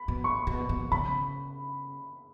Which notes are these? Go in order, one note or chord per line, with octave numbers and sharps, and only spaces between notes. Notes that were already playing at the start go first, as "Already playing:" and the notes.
Already playing: B5
B2
C#6
B2
B2
C#3 B5